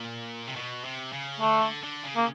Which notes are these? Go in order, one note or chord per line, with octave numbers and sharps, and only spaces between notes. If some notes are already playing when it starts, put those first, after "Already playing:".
Already playing: A#2
C3
B2
C3
C#3
D3 A3
D3
D3
C#3
A#3